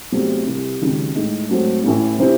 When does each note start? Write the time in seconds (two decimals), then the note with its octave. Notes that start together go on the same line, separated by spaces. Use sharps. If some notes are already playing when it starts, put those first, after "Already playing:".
0.12 E2 C3 F#3 A3 C4
0.46 C2 C3 E3
0.80 C#2 C3 D#3 F#3
1.14 A2 G#3 D#4
1.49 G#2 F#3 A3 C4
1.84 A1 A2 E3
2.18 C3 E3 C4 E4